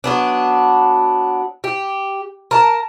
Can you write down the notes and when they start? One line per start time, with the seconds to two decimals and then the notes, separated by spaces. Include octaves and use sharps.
0.04 F#3 B3 D4
1.64 G4
2.51 A#4 A5